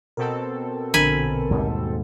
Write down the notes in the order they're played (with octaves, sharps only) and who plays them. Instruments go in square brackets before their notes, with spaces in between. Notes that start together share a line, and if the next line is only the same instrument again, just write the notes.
[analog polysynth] B2 C4 A4 [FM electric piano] A#4
[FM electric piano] A#1 D3 A#4 [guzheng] G#5 B5
[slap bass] D#2 G#2 G3